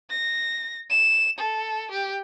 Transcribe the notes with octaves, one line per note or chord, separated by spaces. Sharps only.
A#6
E7
A4
G4